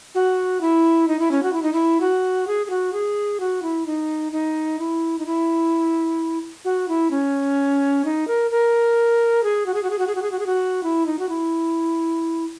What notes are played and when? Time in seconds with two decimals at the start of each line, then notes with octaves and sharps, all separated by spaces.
0.15 F#4
0.61 E4
1.08 D#4
1.19 E4
1.31 C#4
1.43 F#4
1.53 E4
1.62 D#4
1.73 E4
2.01 F#4
2.47 G#4
2.66 G#4
2.70 F#4
2.93 G#4
3.40 F#4
3.62 E4
3.86 D#4
4.32 D#4
4.79 E4
5.19 D#4
5.26 E4
6.65 F#4
6.88 E4
7.11 C#4
8.05 D#4
8.28 A#4
8.51 A#4
9.43 G#4
9.66 F#4
9.74 G#4
9.83 F#4
9.90 G#4
9.99 F#4
10.07 G#4
10.15 F#4
10.22 G#4
10.31 F#4
10.40 G#4
10.46 F#4
10.83 E4
11.06 D#4
11.19 F#4
11.29 E4